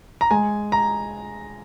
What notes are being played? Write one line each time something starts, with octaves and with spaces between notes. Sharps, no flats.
A#5
G#3 G#5
A#5